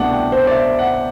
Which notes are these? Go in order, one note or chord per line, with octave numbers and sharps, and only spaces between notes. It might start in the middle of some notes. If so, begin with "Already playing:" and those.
Already playing: C2 B2 A3 D4 D5 F#5
G5
C5
D5
E5
F#5